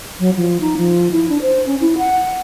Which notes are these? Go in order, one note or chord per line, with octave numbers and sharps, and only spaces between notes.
F#3
F3
D#4
F3
E4
D4
C5
C#4
E4
F#5